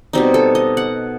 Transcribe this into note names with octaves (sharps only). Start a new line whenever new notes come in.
B2 G3 C4 D#4
A4
D#5
F#5